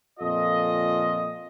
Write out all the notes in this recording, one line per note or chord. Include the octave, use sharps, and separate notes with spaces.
F2 A#2 F4 A4 D#5